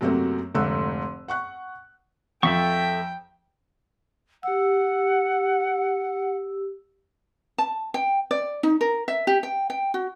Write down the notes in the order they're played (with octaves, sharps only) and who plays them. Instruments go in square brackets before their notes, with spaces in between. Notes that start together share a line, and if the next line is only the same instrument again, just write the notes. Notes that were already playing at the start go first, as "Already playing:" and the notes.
[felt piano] F#2 C3 F#3 A3 A#3 C4
F1 G#2 D3 A3 E6 F#6
F#5 C#6 F#6
[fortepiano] F2 [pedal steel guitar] A4 E5 C#6 [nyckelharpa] G5
[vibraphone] G4 E6 [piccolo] F#5
[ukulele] A5
G5
D5
D#4
A#4
E5
G4
G5
G5
F#4